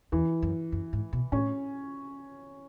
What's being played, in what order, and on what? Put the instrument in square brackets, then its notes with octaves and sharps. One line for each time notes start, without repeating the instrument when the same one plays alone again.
[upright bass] E2 [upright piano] E3
[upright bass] F#2
F#2
G#2
B2
[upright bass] A2 [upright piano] C#4